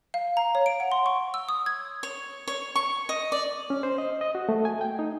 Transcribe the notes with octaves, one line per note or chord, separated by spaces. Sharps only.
F5
A#5
C#5
D7
F#5
C6
C#6
E6
D#6
G#6
C#5
C#5
C#6
D#5
D5
C#4
C5
D#5
D#5
F#4
A3
G#5
G5
D#4